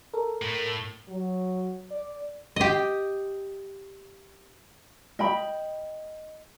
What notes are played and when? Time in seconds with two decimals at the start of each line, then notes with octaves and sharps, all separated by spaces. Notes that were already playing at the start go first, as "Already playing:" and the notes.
0.13 A4 A#4
0.42 A2
1.08 F#3
1.91 D5
2.56 G4 D#5
5.19 D#5 G5 B5